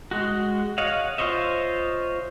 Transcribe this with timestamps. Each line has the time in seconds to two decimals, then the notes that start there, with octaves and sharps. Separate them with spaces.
0.11 G#3 F#4
0.78 C#5 D#5 F5 F#5
1.18 F4 C5 C#5 D#5 E5